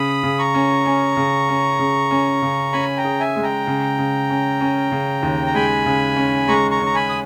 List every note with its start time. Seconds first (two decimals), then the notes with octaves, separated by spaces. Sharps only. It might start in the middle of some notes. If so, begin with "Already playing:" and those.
Already playing: C#3 B5 D#6
0.23 C#3
0.38 A#5 C#6
0.54 C#4
0.86 C#4
1.17 C#3
1.49 C#4
1.79 C#3
2.11 C#4
2.42 C#3
2.73 C#4 G#5 B5
2.97 G5 A#5
3.05 G#4
3.20 E5 G#5
3.36 G#3
3.43 G5 A#5
3.67 C#3
3.98 C#3
4.30 C#4
4.61 C#4
4.92 C#3
5.23 D#2
5.46 A#5
5.54 G#3 G#5 B5
5.86 C#3
6.17 C#4
6.48 G#3 A#5 C#6
6.71 A#5 C#6
6.80 C#4
6.86 A#5
6.95 G#5 B5
7.09 D#6